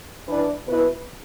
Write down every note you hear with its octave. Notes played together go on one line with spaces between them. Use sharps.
E3 D4 B4 D5
B2 B3 E4 B4